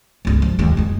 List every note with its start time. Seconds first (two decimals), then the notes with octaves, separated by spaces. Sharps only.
0.25 G1 C#2
0.42 F3
0.59 D#2 G#3
0.77 F#1 G#3